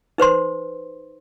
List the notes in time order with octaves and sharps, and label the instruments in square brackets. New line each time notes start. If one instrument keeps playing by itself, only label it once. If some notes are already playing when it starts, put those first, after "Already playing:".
[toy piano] D#4 B4 C5 C6